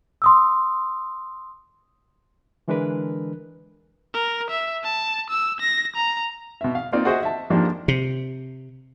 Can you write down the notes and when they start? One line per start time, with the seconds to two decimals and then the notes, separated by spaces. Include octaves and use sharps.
0.22 C6 D#6 E6
2.68 D3 E3 G#3 D4 A#4 B4
4.14 A#4
4.50 E5
4.84 A5
5.30 E6
5.61 A#6
5.96 A#5
6.61 B2 E5
6.75 F5
6.92 A#3 C4 D#4 F4 D5
7.05 F#4 G#4 C5 D#5 E5 F#5
7.23 E5 A5
7.50 F2 G#2 F3 A#3 D4 G4
7.88 C3